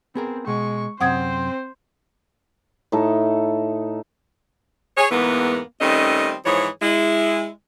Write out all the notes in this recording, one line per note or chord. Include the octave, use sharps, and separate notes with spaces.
B3 C4 G#4 A#4
B2 G#3 C#6
F#2 C3 C4 C5 F#5 D#6 G#6
A2 D#4 A4
G#4 C#5
E2 G#2 E3 A#3 B3
D#3 G3 A3 C4 C#4 D#5
G#2 E3 F3 G#4 C#5
G#3 E4